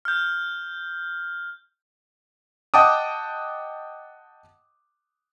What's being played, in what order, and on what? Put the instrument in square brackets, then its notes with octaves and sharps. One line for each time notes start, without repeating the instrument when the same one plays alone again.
[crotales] F6 G6
[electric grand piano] D#5 F#5 G5 A5 D6 D#6